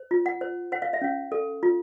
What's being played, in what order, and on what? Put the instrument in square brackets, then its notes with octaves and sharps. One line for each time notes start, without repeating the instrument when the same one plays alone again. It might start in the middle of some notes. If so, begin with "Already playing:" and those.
Already playing: [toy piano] C5
F4
F#5
C5
C5 F#5
F5
E5
C#4 F5
A4
F4